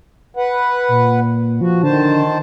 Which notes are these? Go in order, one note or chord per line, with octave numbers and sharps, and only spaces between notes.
B4 F#5
A#2
F3 F#4
D3 D#3 C5 A5